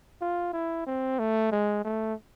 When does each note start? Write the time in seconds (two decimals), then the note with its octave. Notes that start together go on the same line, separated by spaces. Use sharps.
0.21 F4
0.53 E4
0.86 C4
1.19 A3
1.52 G#3
1.85 A3